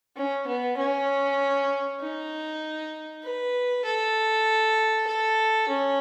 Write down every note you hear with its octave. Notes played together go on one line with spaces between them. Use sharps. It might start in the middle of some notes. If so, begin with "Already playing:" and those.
C#4
B3
C#4
D#4
B4
A4
A4
C#4